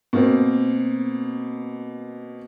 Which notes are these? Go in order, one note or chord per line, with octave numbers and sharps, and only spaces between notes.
B2 A#3 C4